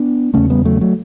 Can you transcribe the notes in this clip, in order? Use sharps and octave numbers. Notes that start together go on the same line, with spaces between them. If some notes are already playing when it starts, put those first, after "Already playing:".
Already playing: B3 D4
E2 C#3 A3 C#4
G3 B3
F#3 A3
F#3 A3